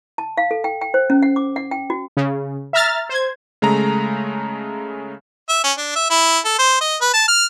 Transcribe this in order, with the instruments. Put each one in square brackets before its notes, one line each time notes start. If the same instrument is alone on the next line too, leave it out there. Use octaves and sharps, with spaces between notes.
[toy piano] A5
F5
A4
G5
G5
C5
C#4
F#5
D6
F#5
G5
F#4
[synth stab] C#3
E5 A#5 F6 A6
C5 G#6
[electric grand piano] C#3 G#3 A3 A#5
[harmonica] E5
C#4
D4
E5
E4
A4
C5
D#5
B4
A5
F6